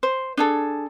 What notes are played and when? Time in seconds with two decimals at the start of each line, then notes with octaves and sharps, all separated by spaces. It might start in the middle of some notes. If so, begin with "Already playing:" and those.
0.03 C5
0.37 D4 G#4 A4